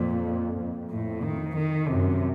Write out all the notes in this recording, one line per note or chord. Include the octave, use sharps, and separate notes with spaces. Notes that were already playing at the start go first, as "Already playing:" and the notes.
Already playing: F2 A#2
F2
A2
D#3
D#3
F#2 C3